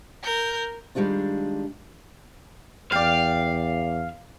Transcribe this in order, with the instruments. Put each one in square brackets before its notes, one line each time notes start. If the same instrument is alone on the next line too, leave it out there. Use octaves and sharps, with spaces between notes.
[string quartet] A#4 G6
[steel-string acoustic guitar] D#3 G3 G#3 D4 F4
[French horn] E2 [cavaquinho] D5 G5 [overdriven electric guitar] F5